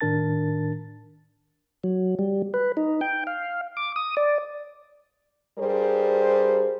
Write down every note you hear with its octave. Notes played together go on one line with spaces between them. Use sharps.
A2 D#3 D4 A#4 A5 A6
F#3
G3
B4
D#4
G5
F5
D6
D#6
D5
G2 G3 G#4 A#4 C5